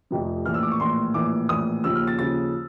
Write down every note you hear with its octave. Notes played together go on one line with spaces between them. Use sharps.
F1 F2 C3 F3
A#1 A2 E3 F6
E6
D6
C#6
A#1 A2 E3 C6
A#1 A2 E3 D6
A#1 A2 E3 D#6
D#2 C#3 F3 E6
F6
A6
D#2 C#3 F3 A6